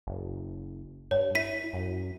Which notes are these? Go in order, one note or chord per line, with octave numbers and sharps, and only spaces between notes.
F#1
G2 C#5
E4 B6 D#7
F#2